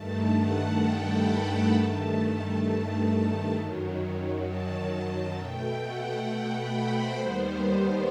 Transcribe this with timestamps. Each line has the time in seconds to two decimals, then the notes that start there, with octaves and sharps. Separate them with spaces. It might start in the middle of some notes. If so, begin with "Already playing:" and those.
Already playing: G2 D#3 A3 A5
0.36 F#5
0.81 G5
1.11 B5
1.41 B5
1.71 G2 D#3 A3 A5
3.55 F#2 D#3 F#3
4.45 A5
4.90 A5
5.36 B2 A3 G5
5.82 F#5
6.28 G5
6.57 B5
6.88 C5
7.18 D#2 D#3 G3 B3